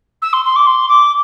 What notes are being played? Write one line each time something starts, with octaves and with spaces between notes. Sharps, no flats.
E6
C6
C6
D6
C6
D6